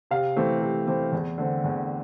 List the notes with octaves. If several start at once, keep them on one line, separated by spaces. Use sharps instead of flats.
C3 F5
E3 A3 C4
C3
E3 A3 C4
E2
D3 A3 C4
E2